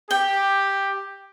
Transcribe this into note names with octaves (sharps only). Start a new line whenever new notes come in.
G4 G5